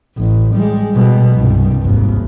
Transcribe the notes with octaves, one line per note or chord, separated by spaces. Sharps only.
A1
G3 G#3
B2 G3
C2 G2
G#1 D#2